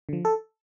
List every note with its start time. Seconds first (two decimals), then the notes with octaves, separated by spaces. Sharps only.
0.09 D3 F3
0.25 A4